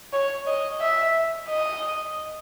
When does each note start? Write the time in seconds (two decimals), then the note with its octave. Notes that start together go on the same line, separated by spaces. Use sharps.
0.13 C#5
0.47 D#5
0.81 E5
1.49 D#5